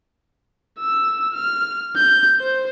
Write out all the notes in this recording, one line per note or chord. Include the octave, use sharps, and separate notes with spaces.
E6
F6
G6
C5